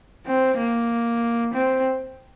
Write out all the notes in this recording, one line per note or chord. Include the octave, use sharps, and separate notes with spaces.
C4
A#3
C4